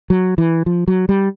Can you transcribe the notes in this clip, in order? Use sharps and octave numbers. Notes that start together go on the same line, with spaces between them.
F#3
E3
F3
F#3
G3